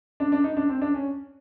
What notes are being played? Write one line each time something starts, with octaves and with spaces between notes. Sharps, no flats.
D4
D4
D#4
D4
C4
D4
C#4